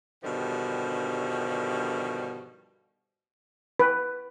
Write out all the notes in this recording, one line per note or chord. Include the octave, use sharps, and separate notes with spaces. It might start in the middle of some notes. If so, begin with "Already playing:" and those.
G2 B2 D3 D#3 F3 G3
B4